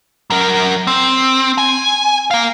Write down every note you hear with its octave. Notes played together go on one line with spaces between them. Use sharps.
F#3 A#4
C4
G#5
A#4 F5